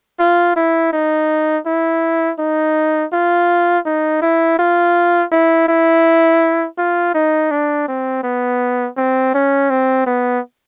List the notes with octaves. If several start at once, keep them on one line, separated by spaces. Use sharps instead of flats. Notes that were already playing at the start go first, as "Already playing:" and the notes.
F4
E4
D#4
E4
D#4
F4
D#4
E4
F4
E4
E4
F4
D#4
D4
C4
B3
C4
C#4
C4
B3